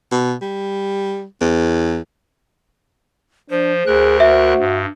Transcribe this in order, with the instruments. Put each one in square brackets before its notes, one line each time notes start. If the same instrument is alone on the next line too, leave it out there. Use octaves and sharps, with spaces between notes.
[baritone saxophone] B2
G3
E2
[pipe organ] F3 [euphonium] D4 [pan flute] C5
[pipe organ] D2 A#4 F#6 [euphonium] G#4
[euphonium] F#4 [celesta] E5
[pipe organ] G2